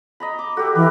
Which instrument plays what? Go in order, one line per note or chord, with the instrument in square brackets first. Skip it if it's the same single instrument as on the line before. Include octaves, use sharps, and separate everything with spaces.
[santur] D#5 A#5 B5
D6
[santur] F#4 G4 [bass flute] A4
[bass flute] E3 [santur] A#4 B4